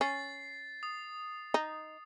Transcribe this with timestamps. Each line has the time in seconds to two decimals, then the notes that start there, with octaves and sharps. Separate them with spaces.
0.01 C#4 A6 C7
0.83 D#6
1.54 D#4